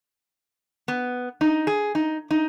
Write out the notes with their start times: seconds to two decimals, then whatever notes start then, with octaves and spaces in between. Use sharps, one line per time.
0.88 B3
1.41 D#4
1.67 G#4
1.95 D#4
2.31 D#4